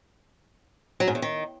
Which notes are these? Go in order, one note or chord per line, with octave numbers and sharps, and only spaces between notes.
F#3
G#2
E2
D#3